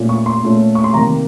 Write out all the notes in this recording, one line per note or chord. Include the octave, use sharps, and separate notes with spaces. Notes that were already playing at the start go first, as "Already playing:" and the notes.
Already playing: A#2 A3 C#4
C#6
C6
A#2 A3 C#4
C#6
C6
C3 D#3 A#3 A#5